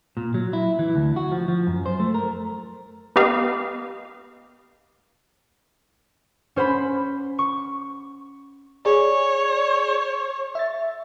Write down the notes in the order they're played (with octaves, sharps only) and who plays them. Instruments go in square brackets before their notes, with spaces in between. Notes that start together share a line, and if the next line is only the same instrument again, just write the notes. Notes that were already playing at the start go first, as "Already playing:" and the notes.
[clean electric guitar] A#2
F#3
E4
E3
D2
F#4
F3
F3
F#2
C5
A3
A#4
[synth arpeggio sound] B3 G4 D#5 F5
[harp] C#4 C5 F#5 B5
C#6
[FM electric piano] G#4 D5 [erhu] C#5
[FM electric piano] E5 A6